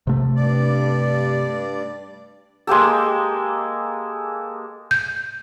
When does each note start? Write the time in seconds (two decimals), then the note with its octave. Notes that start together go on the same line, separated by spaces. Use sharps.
0.07 C3 A3
0.36 G2 D5
2.67 G#3 A#3 G4 A4
4.91 G6